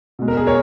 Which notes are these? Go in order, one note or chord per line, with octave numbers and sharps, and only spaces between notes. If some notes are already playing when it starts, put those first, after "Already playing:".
B2 G#3
A#4
G#4
A#4 C#5